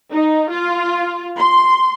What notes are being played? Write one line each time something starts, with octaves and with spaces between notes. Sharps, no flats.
D#4
F4
C6